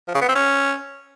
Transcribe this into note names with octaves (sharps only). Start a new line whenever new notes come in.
F3
C#3
B3
C4
C#4